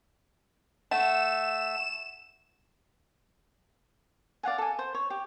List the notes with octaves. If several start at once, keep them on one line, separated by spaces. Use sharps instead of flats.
A3 F#5 E7
D5 F5 F#5 G#5
A4 G#5
C5
C#5
G4